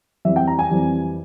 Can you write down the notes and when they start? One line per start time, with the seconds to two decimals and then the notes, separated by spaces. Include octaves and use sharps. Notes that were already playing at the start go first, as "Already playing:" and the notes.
0.25 F2 E3 G3 E5
0.36 G5
0.47 A#5
0.59 G#5
0.70 F2 E3 G3